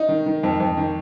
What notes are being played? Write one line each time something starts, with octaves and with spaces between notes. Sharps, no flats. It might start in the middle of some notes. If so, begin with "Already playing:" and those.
Already playing: D#4
D#3
D#3
F2
F2
D#3